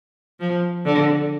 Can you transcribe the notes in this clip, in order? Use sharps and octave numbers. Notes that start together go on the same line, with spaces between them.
F3
D3